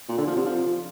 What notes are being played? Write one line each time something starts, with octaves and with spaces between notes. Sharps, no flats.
A#2
D3
F3
C3
F3